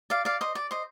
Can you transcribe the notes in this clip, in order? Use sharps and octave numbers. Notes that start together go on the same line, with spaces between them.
D5 F5
D5 F5
C5 D#5
D5
C5 D#5